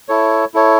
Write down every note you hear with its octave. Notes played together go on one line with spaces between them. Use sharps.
E4 A4 C#5
E4 A4 C#5